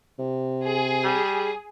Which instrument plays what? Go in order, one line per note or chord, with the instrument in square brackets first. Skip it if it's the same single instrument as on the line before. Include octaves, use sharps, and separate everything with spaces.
[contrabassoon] C3
[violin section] G#4
[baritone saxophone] G3